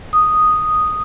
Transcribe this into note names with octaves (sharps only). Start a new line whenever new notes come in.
D#6